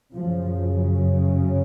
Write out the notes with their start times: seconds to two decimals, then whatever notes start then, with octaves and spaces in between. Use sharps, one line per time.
0.13 F#2 C#3 F3
1.32 F#3